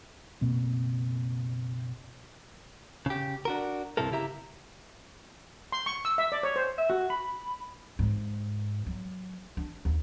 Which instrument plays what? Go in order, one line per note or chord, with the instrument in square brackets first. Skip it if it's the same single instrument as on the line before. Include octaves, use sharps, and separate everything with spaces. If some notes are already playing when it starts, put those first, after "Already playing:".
[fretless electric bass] F#1 B2 A#3 C4
[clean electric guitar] C#3 G4
D4 F#4 A#4
C2 G2 C3 E4 A4 A#4
C#3 E4 G4 E5 A#5
[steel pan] C6
C#6
E6
E5
D5
C#5
C5
[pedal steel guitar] E5
F#4
B5
[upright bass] G#2
F#3
D4
D#2